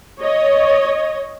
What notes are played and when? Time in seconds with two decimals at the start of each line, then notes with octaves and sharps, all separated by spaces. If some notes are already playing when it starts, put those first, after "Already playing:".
0.20 C#5 D#5